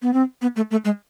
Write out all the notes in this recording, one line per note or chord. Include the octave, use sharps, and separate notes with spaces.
B3
C4
B3
A3
A3
G#3